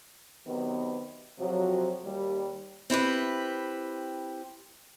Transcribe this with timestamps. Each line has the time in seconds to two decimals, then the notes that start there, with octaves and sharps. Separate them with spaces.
0.47 C3 D#3 F#3 B3
1.39 F2 C3 F3 F#3
2.04 D#2 G3
2.90 C4 E4 G4 B4